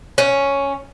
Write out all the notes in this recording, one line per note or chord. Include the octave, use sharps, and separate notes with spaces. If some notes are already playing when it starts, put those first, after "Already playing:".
C#4